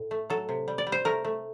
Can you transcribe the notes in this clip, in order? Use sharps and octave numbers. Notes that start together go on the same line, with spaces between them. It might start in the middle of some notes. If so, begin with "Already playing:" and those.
Already playing: A2
A3
F#3 A4
C3
G3
D5
G3
C5
A3 A#4
A3